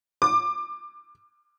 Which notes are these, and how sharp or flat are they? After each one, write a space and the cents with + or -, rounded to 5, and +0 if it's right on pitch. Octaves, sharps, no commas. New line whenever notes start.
D6 +20